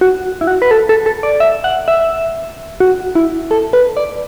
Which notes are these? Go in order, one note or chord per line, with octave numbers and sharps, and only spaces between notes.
F#4
E4
F#4
B4
A4
A4
A4
D5
E5
F#5
E5
F#4
E4
A4
B4
D5